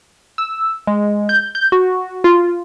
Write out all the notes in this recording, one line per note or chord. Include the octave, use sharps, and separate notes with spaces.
E6
G#3
G6
G6
F#4
F4